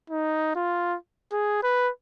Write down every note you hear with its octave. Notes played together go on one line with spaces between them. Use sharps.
D#4
F4
G#4
B4